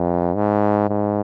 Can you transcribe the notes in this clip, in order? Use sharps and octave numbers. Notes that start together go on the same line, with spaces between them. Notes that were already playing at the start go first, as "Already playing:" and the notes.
Already playing: F2
G#2
G#2